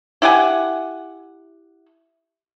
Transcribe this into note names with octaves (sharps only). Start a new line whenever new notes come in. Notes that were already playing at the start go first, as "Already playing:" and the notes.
E4 G4 F#5 G#5